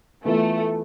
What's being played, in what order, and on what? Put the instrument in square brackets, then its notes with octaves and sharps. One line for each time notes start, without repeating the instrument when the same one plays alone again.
[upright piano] E3 B3 F4 [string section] A3